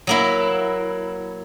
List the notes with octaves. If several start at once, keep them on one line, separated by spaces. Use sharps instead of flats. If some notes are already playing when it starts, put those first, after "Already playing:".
F#3 A#3 E4